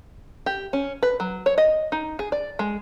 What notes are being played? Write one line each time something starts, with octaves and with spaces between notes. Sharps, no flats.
G4
C#4
B4
F#3
C#5
D#5
D#4
G#4
D5
G#3